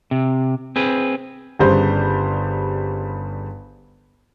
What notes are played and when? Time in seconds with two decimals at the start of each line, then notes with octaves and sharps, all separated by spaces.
0.11 C3
0.76 C4 G#4 B4
1.59 G1 C#3 G3 C5